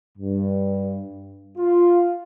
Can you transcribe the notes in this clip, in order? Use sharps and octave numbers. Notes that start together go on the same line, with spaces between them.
G2
F4